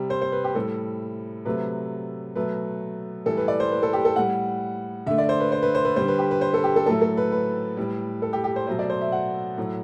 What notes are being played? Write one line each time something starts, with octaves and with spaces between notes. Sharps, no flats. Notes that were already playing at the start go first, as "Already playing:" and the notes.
Already playing: C3 G3
C5
C5
B4
G4
A2 G3 A4
C3 F#3 A3 B4
B2 F#3 A3 B4
A2 E3 G3 A4
B4
D5
C5
B4
A4
G4
A4
A2 G3 F#5
D3 A3 E5
D5
C5
B4
C5
B4
C5
B4
D3 G3 C5
B4
G4
B4
C5
A4
G4
A4
A2 F#3 A3 A4
A4
B4
B4
A2 G3
A4
G4
G4
C5
B2 F#3 A3 C5
D5
C5
E5
F#5
A2 F#3 A3